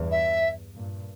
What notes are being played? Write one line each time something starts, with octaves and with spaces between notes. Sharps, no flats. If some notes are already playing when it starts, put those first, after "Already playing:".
Already playing: E2 G2
E5
G2 A#2